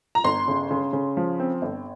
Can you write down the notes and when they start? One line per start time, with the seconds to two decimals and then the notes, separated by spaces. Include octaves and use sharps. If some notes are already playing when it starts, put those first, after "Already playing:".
0.15 A#5
0.24 G1 C6
0.48 C#3
0.71 C#3
0.93 C#3
1.17 F3
1.40 C4
1.62 G1